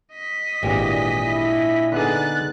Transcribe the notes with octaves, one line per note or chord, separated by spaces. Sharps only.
D#5 B6
G#1 A#2 E3 D4 G4
E4
D3 B3 D#4 G#4 F#6 A6